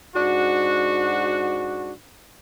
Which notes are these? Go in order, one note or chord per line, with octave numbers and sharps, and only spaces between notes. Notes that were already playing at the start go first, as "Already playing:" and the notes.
G#2 D4 F#4